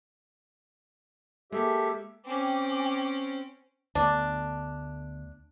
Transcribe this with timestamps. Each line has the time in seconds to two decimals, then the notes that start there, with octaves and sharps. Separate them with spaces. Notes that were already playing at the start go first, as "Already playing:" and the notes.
1.52 G#3 A#3 G4 A4 E5
2.25 C4 C#4 G5 G#5 D6
3.95 D2 A3 B3 D4